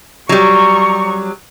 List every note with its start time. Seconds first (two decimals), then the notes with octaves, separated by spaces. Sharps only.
0.29 F#3 G3 A#5 C#6